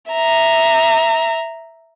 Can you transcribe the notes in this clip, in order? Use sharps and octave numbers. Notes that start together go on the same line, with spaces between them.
E5 A#5